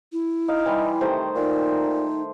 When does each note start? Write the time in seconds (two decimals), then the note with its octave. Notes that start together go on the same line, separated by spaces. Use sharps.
0.12 E4
0.48 D#4 F5
0.66 E3 G3 C6
1.01 C3 D#3 A3 C5
1.36 A#2 D#4